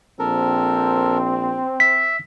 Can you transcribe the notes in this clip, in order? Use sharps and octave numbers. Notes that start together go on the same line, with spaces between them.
A#1 C4 A4 A#4
E5 B6